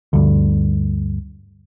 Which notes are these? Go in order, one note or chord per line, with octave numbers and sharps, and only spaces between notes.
D2 G2